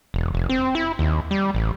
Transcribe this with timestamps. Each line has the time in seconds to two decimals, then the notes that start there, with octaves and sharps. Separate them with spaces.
0.14 E1
0.34 F1
0.49 C4
0.75 E4
0.99 D#2
1.31 G3
1.55 A1